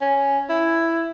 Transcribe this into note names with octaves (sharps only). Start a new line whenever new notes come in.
C#4
E4